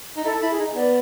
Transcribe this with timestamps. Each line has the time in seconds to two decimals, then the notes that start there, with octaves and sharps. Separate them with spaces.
0.17 D#4
0.25 E4 A4
0.42 E4
0.50 G#4
0.59 D#4
0.75 B3 D5